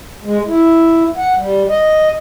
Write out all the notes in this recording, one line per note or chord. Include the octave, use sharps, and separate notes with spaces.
G#3
E4
F#5
G3
D#5